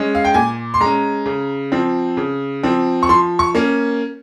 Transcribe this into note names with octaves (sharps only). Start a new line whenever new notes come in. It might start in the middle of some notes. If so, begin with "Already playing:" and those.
Already playing: G#3 C#4
F5
G5
A#2 G#5
C6
G#3 C#4 A#5
C#3
F3 C4
C#3
F3 C4
C#6
F3 C6
C#6
A#3 C#4